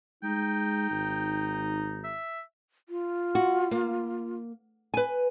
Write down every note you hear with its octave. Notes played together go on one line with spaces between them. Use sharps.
G#3 D#4 G5
G#1
E5
F4
F#4
A#3
B4 G#5